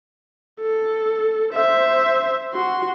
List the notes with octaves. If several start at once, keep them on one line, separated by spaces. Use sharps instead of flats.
A4
C5 E5
F#4 C6